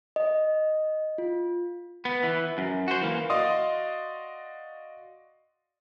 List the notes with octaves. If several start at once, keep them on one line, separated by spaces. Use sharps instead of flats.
D#5
F4
B3
E3
F#2
F#4 C5
E3 A#3
F#4 D5 D#5 F5 C6 D#6